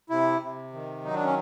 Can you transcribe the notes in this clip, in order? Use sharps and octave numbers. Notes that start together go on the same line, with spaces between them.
C3 E4
C3
D#3
F#3 D#4
D4
C#4